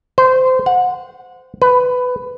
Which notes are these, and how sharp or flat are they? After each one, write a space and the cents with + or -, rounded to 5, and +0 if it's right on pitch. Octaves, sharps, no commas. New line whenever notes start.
C5 -25
F#5 -25
B4 +15